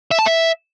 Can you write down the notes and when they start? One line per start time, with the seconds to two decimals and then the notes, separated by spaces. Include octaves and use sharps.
0.11 E5
0.19 A5
0.26 E5